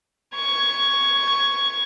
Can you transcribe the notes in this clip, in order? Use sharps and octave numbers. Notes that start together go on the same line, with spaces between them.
C#6 G#6